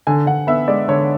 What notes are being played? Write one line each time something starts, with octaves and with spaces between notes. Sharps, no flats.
D3 G#5
D3 F#5
B3 E5
G#3 D5
D3 C#5